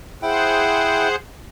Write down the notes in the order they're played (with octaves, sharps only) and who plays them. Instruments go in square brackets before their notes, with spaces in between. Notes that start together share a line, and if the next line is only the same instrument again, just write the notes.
[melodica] E4 G5 [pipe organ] G#4 C5 F#5